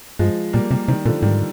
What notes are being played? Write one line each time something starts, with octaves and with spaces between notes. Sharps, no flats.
G2 F3 G#3
A#2 G3 A#3
C3 G3 A#3
C3 D#3 G3
A#2 D3 F3
G#2 D#3 G3